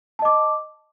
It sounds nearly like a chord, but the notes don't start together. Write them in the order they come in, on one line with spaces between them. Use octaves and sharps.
A5 D#5 D6